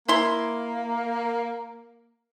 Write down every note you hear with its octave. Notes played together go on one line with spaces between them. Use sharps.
A#3 E4 C6